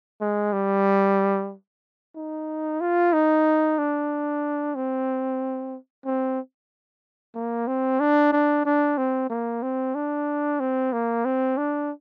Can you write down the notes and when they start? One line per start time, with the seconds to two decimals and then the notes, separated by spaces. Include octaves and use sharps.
0.21 G#3
0.53 G3
2.16 D#4
2.81 F4
3.13 D#4
3.78 D4
4.75 C4
6.05 C4
7.35 A#3
7.67 C4
8.00 D4
8.32 D4
8.65 D4
8.98 C4
9.30 A#3
9.63 C4
9.95 D4
10.60 C4
10.93 A#3
11.25 C4
11.57 D4